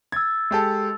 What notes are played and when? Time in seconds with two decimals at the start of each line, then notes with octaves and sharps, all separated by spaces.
0.12 E6 G#6 A6
0.51 G#3 G4 A4